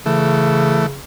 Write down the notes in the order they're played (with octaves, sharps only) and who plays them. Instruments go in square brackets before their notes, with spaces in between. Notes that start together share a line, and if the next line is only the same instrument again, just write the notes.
[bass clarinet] C#3 [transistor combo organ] E3 A3